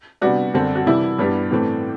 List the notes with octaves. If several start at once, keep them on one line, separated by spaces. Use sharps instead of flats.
C3 G3 B3 D4 F#4
F#2 D3 G3 C4
F#4
C3 E3 G3 E4
G2 E3 G3 B3 D4
A2 E3 A3 C4